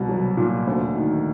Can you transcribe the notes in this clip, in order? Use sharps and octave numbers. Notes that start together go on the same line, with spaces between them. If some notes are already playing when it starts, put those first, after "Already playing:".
Already playing: C2 B2
F#3
A#2
D2
D#3